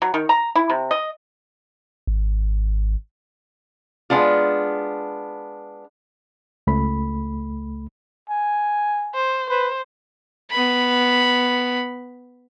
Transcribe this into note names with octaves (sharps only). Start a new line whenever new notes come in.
F#3
D#3
A#5
E4
C3
D#5
G#1
G#3 B3 D4 F4
C#2 A3 B5
G#5
C5
B4 C5
B3 B5